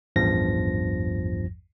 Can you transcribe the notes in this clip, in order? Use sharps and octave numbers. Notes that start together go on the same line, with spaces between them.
A1 E2 G2 F3 A#6